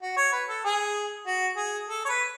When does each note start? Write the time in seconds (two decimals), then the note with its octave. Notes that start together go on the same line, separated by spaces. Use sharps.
0.02 F#4
0.17 C#5
0.33 B4
0.49 A4
0.65 G#4
1.27 F#4
1.57 G#4
1.89 A4
2.05 C#5
2.09 B4